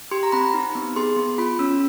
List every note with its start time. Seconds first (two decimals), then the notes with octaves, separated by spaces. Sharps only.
0.11 G4 C6
0.23 A#5
0.32 C4 B5
0.54 D#4
0.75 B3
0.96 G#4 C6
1.17 B3
1.38 F4 B5
1.59 C#4 E6